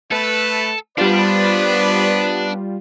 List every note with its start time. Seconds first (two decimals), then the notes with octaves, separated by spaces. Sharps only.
0.12 A3 A4 B4
0.98 G3 B3 D4 F4 G4 B4 C5 D5